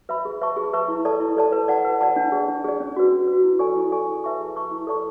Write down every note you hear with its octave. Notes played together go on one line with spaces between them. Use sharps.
B4 E5 B5
G#4
B4 E5 A5 C#6
G#4
B4 E5 A5 C#6
E4
A4 D5 A5
E4
A4 D5 A5
B4
D5 F#5 A5
B4
D5 F#5 A5
D4
G#4 D5
D4
G#4 D5
C#4
F#4 B4
C#4
B4
F#4
E4
A4 D5 G#5 C#6
E4
A4 D5 G#5 C#6
G#4
B4 E5 A5 C#6
G#4
B4 E5 A5 C#6
E4
A4 D5 A5 C#6